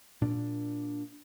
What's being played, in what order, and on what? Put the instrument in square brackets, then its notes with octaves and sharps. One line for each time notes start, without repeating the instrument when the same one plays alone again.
[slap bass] A#2 D4